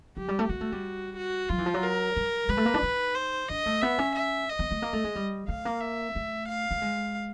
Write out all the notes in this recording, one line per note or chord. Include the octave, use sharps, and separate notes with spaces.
F#3 G4
G3
A3
A#3 F#4
A3
G3
F#4
F#3 F4
E3
F3
F#3
A#4
G3
G#3 B4
A3
A#3
D4
D#4
C5
D4 D#5
A3
B3 E5
C#4
E5
D#5
B3
A3
A#3
A3
G#3
G3
A3 F5
A#3
E5
A3
F5
A3
G#3